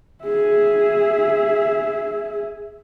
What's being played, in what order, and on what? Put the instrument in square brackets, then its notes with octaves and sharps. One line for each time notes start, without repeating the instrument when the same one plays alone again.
[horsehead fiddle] G#4 E5